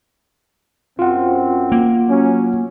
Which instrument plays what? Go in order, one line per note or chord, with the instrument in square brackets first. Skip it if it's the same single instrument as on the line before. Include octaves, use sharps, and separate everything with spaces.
[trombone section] F#2 C4 [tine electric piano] F4 F#5
[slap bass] A#3
[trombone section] F#3 C#4